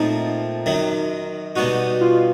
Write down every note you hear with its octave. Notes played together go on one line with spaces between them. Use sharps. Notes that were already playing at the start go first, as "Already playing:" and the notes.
Already playing: A#2 F3 A3 C4 D#4
F#2 D#3 F#3
B2 G3 B3 D#4 F#4
F#4
F4